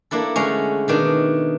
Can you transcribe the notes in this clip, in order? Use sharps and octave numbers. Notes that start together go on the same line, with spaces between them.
A#3 D4 E4 A4
D3 G#3 A3 C#4
B2 D#3 D4